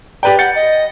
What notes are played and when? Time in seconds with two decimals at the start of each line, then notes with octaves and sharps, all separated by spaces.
0.23 G4 B4 D5 G5
0.39 F#5 G6 A6 C#7
0.55 D#5